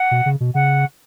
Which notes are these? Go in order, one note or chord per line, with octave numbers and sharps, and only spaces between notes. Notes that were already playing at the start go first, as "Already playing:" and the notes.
Already playing: F#5
B2
C#3
B2
C#3 F#5